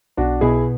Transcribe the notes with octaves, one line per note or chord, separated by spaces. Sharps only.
B1 D4 F#4
B2 E4 G#4